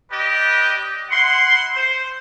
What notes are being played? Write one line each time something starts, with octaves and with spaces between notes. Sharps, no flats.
G4 B4 D5 D#5
E4 F#5 C6
C5